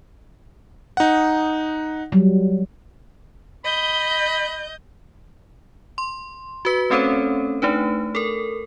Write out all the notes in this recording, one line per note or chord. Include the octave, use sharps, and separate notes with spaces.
D#4 F#5
F#3 G3
D#5 B5 G6
C6
F#4 B4 B6
A3 C4 C#4 A4 C5 C#5
A3 D4 D#4 B4
A4 A#4